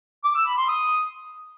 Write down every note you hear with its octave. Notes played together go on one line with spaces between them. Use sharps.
D6
E6
B5
C6
D#6